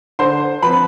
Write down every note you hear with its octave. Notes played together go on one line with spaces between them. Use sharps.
D3 C5 C6
F3 C4 B4 B5